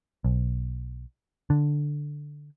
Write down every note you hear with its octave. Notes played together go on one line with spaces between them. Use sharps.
B1
D3